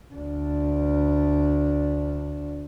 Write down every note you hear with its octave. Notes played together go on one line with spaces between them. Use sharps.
D2 D4